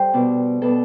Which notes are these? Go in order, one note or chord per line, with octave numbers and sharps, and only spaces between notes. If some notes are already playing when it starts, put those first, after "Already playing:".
Already playing: G3 A4 C5 G5
B2 B3 D4
B2 B3 D4 A4